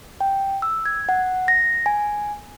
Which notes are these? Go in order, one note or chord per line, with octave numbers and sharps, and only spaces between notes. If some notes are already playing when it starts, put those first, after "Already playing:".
G5
E6
G#6
F#5
A#6
G#5